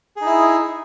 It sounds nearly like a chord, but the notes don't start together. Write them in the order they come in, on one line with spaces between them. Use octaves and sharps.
G#4 D#4 E4